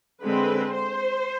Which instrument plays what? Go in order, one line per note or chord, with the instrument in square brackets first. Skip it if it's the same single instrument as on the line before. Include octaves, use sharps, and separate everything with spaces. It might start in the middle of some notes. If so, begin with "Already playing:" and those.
[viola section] D3 G#3 C4 B4
C5